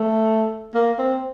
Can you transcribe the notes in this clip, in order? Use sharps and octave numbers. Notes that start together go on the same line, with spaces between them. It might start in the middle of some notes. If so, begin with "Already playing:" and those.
Already playing: A3
A#3
C4